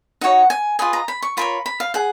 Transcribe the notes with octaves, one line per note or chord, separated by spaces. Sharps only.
D#4 F#4 C#5 F#5
G#5
F4 G#4 B4 D#5 G#5
A#5
B5
C#6
F4 A#4 C#5 B5
B5
F5
G#4 F#5